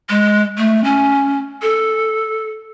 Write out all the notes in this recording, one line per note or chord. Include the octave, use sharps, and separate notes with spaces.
G#3
A3
C#4
A4